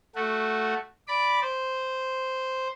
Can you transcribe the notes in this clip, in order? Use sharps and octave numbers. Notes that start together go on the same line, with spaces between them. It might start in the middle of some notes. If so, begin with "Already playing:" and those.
A3 F#4
D5 B5 D6
C5